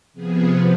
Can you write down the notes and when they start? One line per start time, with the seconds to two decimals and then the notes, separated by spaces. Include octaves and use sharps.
0.13 C3 F3 B3 G#4